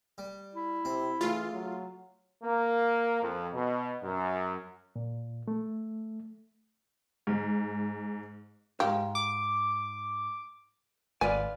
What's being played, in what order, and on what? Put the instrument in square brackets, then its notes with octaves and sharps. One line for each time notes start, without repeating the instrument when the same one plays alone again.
[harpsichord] G3
[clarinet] E4
[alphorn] C3 [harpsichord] C4
[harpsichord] C#3 A3 [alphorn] E3 [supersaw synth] F4
[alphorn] F#3
[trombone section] A#3
F2
B2
F#2
[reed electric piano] A#2
A3
[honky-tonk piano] G#2
[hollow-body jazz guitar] G#2 F5 [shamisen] G4
[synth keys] D6
[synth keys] G#1 [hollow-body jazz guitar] F4 B4 D5 [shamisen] G#5